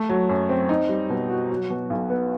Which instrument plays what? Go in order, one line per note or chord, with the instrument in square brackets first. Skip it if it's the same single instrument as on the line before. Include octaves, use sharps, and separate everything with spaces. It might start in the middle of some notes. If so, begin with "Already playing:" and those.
Already playing: [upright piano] A3
F#3
F#2
C4
D#4
G3
B2
F#4
F#3
B2
B1
B3